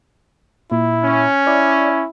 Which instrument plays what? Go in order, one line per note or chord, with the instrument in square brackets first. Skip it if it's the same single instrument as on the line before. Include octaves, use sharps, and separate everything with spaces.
[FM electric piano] A#2 [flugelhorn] E4
[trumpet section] C#4
[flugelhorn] E4 [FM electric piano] D5